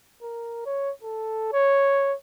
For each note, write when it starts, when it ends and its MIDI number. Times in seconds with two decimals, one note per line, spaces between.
0.22 0.62 70
0.66 0.91 73
1.03 1.49 69
1.53 2.15 73